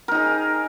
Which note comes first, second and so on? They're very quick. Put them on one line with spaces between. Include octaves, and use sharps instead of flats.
A#4 D#4 G#4